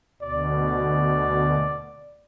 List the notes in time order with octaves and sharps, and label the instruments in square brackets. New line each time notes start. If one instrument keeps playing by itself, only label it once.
[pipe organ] D2 B2 [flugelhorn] D5